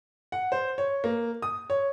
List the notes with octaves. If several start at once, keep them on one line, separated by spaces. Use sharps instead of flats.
F#5
C5
C#5
A#3
D#6
C#5